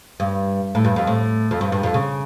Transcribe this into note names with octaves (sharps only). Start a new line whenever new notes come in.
G2
A2
G2
F2
A2
F2
G2
G2
F2
C#3